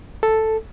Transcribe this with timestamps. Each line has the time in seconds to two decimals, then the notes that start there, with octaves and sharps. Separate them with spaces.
0.23 A4